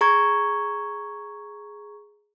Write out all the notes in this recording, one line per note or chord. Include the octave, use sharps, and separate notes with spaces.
G#4 A#5 C#6 G#6